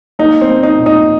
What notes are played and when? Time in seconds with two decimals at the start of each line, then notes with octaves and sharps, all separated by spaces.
0.19 A#3 D#4
0.41 C4
0.49 A#3
0.63 D#4
0.78 A#2
0.86 D#4